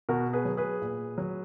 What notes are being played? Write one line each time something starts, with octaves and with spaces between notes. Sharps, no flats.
B2 F#4 A#4
G#4 B4
F#3
G#4 B4
A#2
F#3